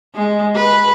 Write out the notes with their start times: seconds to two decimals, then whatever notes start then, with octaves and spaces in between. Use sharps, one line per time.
0.15 G#3
0.55 B4